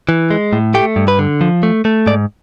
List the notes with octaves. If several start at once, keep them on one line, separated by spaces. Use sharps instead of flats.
E3
G#3
A2
A3 G4
G2
B4
D3
F3
A3
A3
G#2 D5